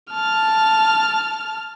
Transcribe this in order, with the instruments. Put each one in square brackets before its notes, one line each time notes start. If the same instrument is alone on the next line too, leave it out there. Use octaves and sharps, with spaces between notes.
[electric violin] A5 F6